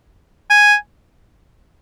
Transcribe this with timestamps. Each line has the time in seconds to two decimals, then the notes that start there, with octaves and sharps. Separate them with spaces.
0.50 G#5